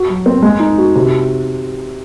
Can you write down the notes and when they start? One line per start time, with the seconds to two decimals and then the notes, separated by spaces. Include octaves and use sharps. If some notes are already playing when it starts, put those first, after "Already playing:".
Already playing: F#4
0.08 F#3
0.26 C4
0.42 G#3
0.60 D#4
0.78 F#4
0.96 C3